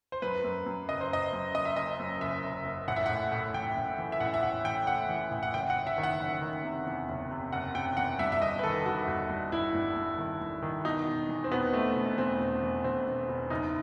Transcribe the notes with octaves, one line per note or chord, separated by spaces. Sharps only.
C5
F#2 B4
F#2
F#2
F#1 D#5
C5
F#1 D#5
F#2
F#1 D#5
E5
F#1 D#5
F#2
F#1 E5
F#1
F#1
A1 F#5
E5
A2 F#5
A2
A1 G5
A1
E3
E5
A1 F#5
E5
A1 F#5
A1 G5
A2 F#5
E3
A1
F#5
F#1 G5
F#5
F#1
E5
D#3
F#5
F#1
D#3
C3
E2
F#1
C3
F#1 F#5
C3 G5
E2 F#5
G2 E5
E5
G1 D#5
B4
D#3 A4
D#3 F#4
G1
G2
G1 E4
G2
G2
D#3
G2
D#3
B2 D#4
E1
E2
C4
B2 B3
B2 A3
E1
E2 C4
E1
E2
E1 C4
E1
E1
F#1 D#4